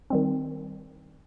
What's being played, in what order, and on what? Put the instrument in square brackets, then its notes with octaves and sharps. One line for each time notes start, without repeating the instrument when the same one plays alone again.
[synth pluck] D#3 G3 C4